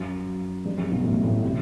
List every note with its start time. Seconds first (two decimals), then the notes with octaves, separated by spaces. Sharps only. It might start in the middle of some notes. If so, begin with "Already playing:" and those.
Already playing: F#2
0.65 G2
0.78 F#2
0.91 B1 B2
1.04 A1 A2
1.23 A1 A2
1.43 C3